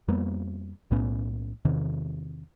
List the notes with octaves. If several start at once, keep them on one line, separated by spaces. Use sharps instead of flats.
F2 G3 A#3 B3
B1 A2 B3 C#4
E2 C3 D#3